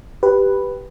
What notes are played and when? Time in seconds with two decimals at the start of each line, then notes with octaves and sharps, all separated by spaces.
0.23 G4 B4